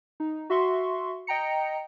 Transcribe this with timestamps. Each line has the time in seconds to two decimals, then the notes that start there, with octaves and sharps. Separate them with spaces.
0.20 D#4
0.50 F#4 E5 C6 C#6
1.27 D#5 G5 A#5 C#7